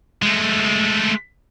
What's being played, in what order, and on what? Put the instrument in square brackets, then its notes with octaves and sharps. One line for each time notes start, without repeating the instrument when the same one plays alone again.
[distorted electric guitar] G#3 A3